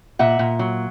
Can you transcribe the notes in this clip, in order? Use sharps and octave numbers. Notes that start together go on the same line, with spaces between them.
A#2 E5 F#5
A#2
F#3